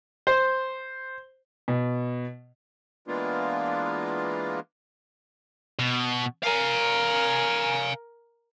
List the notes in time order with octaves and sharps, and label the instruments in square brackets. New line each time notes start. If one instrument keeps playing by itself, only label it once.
[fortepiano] C5
[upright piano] B2
[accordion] E3 G#3 A#3 B3 D4 F4
[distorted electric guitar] B2
[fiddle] A#4 [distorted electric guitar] F5 G#5